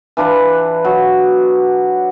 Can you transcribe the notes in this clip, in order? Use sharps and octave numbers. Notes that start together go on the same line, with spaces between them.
E3 D4 F4 B4
F#3